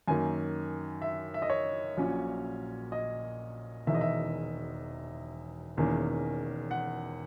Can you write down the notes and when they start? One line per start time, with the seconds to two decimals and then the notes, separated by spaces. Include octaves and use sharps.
0.08 F#2 D#3 A#3 G#5
1.02 E5
1.34 E5
1.42 D#5
1.50 C#5
1.97 A#1 A#2 F#3 C#4
2.92 D#5
3.87 E1 E2 D#3 E5
3.95 D#5
4.01 E5
5.77 E1 E2 D#3 A#3 C#4
6.71 F#5